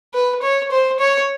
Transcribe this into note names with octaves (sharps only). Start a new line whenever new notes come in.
B4
C#5
C5
C#5